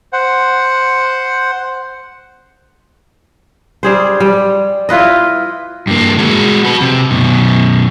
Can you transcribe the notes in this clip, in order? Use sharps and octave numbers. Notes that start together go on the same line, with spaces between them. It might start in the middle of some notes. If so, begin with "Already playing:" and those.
C5 F#5
G3 G#4 C5
G3
E4 F4 B4 D#5
G2 A#3
G#3 F#4
F#4 B4
C3
F#2 B2